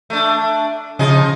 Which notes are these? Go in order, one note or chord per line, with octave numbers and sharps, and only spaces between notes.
A3 D4
C#3 F3 D#4 G#4